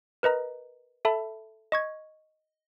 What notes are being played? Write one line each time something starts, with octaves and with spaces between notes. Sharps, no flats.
A#4 B4 D#5 A#5
A4 E5 A5 B5
D#5 C#6 G#6